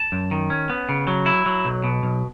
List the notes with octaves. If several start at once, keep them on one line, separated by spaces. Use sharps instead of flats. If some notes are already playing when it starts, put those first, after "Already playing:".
Already playing: A5
F#2
D#3
C#4
B3
C#3
F#3
E4
F#3
B1
B2
B1